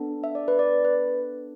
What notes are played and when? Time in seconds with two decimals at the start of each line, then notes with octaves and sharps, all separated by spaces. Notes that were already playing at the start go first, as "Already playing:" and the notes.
Already playing: B3 D4 A4
0.24 E5
0.35 D5
0.48 B4
0.59 D5
0.85 B4